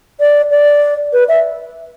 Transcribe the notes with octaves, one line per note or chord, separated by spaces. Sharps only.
D5
D5
B4
E5